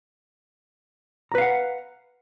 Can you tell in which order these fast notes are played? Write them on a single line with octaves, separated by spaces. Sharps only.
A#5 B4 F5 F#5